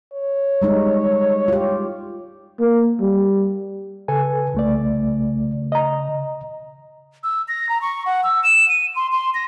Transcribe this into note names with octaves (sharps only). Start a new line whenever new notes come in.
C#5
G3 G#3 D#4
F4 G4
A#3
G3
C#3 A4 B4 G#5
C2 A3 D5
D#5 A#5
E6
A#6
A#5
C#6
F#5
E6
E7
D#7
C6
C6
A#6